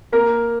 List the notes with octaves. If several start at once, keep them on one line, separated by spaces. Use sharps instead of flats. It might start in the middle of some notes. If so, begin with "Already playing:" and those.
A#3 A#4